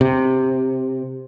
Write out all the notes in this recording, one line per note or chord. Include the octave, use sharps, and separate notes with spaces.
C3